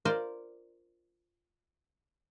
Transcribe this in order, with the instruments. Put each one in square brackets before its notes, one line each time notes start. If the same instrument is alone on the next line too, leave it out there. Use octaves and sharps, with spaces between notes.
[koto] F4 A#4 C5 D5